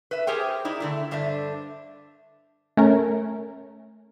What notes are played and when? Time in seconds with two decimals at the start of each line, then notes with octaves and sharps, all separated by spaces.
0.11 B4 E5
0.27 G4 G#4 A#4 C5 G5
0.65 D#4 E4 D5
0.80 D3 A3 E4
1.11 G2 D3 D4 C5 E5
2.77 A3 C#4 A#4